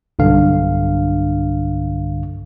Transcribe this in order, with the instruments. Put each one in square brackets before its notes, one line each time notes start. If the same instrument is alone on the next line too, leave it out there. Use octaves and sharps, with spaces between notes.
[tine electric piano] B1 G2 D3 F5